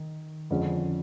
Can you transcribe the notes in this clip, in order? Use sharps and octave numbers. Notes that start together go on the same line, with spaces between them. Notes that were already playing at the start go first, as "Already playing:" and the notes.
Already playing: D#3
F2 D3 F3 G#3 C#4